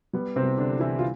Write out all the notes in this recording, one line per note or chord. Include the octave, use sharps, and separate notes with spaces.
G3 B3
C3 C4
C2
D3 D4
C2
E3 E4
F4